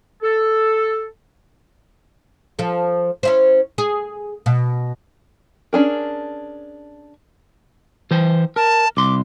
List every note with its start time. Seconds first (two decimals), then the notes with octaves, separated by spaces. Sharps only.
0.23 A4
2.59 F3 A4
3.23 C#4 E4 C5
3.78 G#4
4.46 B2
5.73 C#4 D4 G#4 A#4
8.11 E3 C5 G5
8.56 A#4 A5
8.97 C2 C6 D6